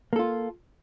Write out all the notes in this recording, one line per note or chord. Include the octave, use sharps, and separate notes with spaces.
A#3 F4 A4